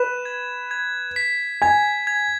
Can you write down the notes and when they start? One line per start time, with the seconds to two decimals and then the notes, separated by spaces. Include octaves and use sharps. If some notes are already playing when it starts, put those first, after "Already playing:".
Already playing: B4 E7
0.25 G#6
0.71 G#6
1.16 B6
1.62 G#5 G#6
2.07 G#6